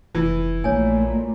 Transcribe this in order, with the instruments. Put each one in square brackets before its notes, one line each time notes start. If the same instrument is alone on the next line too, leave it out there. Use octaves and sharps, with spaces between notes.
[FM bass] F1 [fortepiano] E3
[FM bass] A#1 [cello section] A#2 A3 [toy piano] C#5 G#5